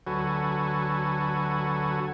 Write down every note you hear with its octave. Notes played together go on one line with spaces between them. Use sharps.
D2 F#3 F#4 A4 B4 G#5